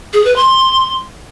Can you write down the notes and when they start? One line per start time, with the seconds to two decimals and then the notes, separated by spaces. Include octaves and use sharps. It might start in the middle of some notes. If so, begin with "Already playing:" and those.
0.13 G#4
0.25 B4
0.36 C6